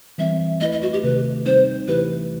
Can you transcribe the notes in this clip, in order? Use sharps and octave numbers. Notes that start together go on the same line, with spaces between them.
E3 G3 C4 E5
A3 E4 B4 D#5
D#5
F#4
G4
C3 D#3 A3 B4
G3 C4 D#4 C5
C3 E3 A3 E4 G4 B4